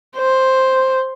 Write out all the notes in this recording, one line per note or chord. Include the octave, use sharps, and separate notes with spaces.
C5